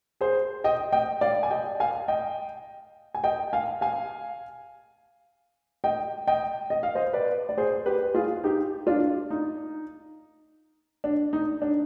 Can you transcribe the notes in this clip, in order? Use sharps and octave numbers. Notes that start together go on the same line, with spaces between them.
G#4 C5
D#5 G5
D#5 G5
D5 F5
G#5
D#5 G5
F5 G#5
D#5 G5
G#5
D#5 G5
F5 G#5
F5 G#5
D#5 G5
D#5 G5
D#5
F5
C5 D#5
B4 D5
D5
G#4 C5
G4 B4
F4 G#4
D#4 G4
D4 F4
D#4
D4
D#4
D4